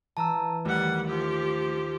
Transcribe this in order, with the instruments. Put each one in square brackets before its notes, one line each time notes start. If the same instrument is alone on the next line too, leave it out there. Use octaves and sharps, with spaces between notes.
[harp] E3 [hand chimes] A5 A#5 E6
[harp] D#2 [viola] G3 F#5 [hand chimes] A3
[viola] F3 G4